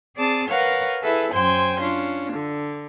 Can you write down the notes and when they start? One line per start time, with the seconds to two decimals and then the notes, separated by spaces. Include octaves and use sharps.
0.16 C4 G#4 D5 A5
0.48 A#4 B4 C#5 F5 F#5
1.02 E4 G#4 A4 B4 E5
1.32 F#2 C5 G5 G#5 C6
1.81 C#4 D4 F4
2.33 D3